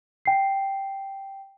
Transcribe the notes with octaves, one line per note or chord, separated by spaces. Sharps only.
G5 C7